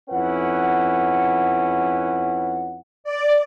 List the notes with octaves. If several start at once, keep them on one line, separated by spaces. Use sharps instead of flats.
F2 C#4 E4 B4 F#5
D5